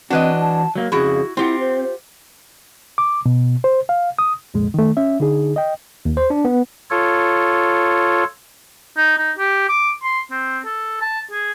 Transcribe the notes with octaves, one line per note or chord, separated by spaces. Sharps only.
E3 C4 D4 F#4 B4 D#5
A5
F#3 A#3
F2 C#3 E4 F#4 G#4
C4 E4 F4 G4 F#5
C5
D6
B2
C5
F5
D#6
C2 F2 A#2 G#3
D#3 A3
C#4 E5
D3 D#4 G#4
D#5 G5
D#2
C5
D4
B3
F4 A4 C#5
D#4
D#4
G4
D6
C6
C4
A4
A5
G#4